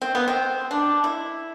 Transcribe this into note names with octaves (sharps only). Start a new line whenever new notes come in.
C4
B3
C4
D4
E4